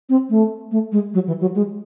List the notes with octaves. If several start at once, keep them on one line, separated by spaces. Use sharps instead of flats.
C4
A3
A3
G#3
F#3
E3
F#3
G#3